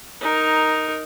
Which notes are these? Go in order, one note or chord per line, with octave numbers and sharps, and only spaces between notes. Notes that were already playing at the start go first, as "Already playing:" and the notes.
D#4 A#4